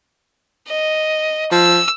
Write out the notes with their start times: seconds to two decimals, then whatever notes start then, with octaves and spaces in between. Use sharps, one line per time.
0.68 D#5
1.51 F3 E6